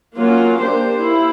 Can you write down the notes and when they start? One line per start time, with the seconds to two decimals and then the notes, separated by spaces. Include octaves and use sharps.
0.17 F#3 A#3 C#4 F4
0.60 A#3 D4 G4 C5
1.02 E4